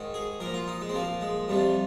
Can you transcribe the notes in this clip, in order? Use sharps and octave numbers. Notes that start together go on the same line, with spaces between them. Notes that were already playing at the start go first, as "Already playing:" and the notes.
Already playing: G#2 D#3
G#4
A#2 F3 A#4
F4
D#4
G#3
C4
A#2 F3 A#3
G#3
F2 C3 F3 G3